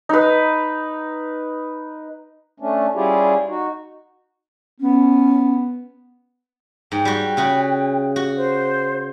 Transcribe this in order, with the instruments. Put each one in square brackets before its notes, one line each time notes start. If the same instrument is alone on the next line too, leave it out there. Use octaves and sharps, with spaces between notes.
[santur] D#4 B4
[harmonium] A3 C#4 D4
G3 C#4 E4 F4 G4 G#4
D#4 F#4
[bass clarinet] B3 [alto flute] C#4
[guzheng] G#2 [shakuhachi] G5
[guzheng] G3 F#4
C#3 F#4 B5
[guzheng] F#4 [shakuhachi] G4
[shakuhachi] C5